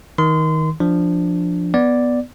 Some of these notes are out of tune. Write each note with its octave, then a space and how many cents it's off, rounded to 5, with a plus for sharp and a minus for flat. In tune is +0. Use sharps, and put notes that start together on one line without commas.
D#3 +20 C6 -30
F3 +0 D4 +0
B3 +0 D5 +0